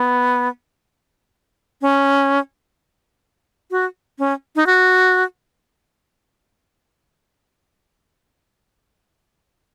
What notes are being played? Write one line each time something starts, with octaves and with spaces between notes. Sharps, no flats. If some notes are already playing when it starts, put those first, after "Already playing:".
Already playing: B3
C#4
F#4
C#4
D#4
F#4